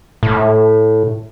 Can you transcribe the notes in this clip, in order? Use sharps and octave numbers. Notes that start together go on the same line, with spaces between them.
A2